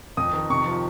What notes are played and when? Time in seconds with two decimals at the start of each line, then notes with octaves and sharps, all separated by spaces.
0.17 F2 D#6
0.33 D#3
0.50 C3 C#6
0.66 F3